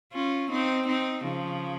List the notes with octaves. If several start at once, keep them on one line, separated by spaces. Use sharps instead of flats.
C#4 F4
C4 D#4
C4 D#4
C#3 F3